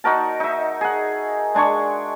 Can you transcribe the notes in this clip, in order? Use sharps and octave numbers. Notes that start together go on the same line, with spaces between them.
D#4 F#4 A#4 A5
D#4 E5
G#4 F#5
G#3 D4 G#5 C#6